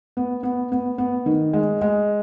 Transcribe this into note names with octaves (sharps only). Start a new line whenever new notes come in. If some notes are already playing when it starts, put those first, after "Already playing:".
B3
B3
B3
B3
D#3
G#3
G#3